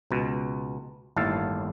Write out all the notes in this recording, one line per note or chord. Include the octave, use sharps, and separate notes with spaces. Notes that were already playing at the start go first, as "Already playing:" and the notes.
C#2 B2
G1 D#2 A2 A4 F5 A5